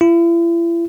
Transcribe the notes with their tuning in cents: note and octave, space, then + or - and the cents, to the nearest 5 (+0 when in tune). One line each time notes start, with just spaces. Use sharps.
E4 +40